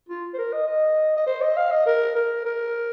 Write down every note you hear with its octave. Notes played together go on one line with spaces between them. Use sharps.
F4
C5
A#4
D#5
D#5
D#5
C5
D#5
F5
D#5
A#4
A#4
A#4